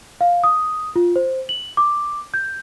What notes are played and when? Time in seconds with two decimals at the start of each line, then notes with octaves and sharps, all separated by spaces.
0.21 F5
0.44 D#6
0.96 F4
1.16 C5
1.49 F#7
1.77 D6
2.34 G6